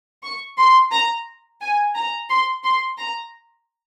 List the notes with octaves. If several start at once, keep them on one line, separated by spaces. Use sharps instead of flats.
C#6
C6
A#5
G#5
A#5
C6
C6
A#5